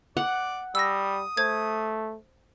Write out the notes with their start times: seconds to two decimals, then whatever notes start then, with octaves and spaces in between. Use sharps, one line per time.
0.17 D5 F#5
0.75 G3 D#6 E6 A#6
1.37 A3 C5 G#6